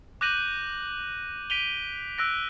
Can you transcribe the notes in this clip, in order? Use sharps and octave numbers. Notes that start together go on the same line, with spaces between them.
D6 F#6 G6 A#6 D#7 F#7
B6 D7 D#7 F7 G7
E6 F#6 A#6 D7